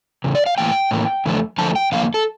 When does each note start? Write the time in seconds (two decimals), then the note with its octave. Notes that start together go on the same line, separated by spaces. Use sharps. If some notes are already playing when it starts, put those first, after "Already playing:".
0.24 E2 C#3
0.35 D5
0.46 F5
0.58 A2 E3 A#3 G5
0.91 A2 E3 A#3
1.26 E2 D3 F3 A3
1.58 E2 D3 F3 A3 A5
1.76 G5
1.92 E2 D3 F3 A#3 F5
2.14 A4